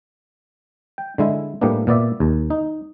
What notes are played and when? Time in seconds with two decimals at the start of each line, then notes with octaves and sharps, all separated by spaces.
0.98 G5
1.18 D3 G#3 E4
1.61 A2 G3 A#3 B3 D4
1.87 A#2 B3 D5 E5
2.20 D#2
2.50 D#4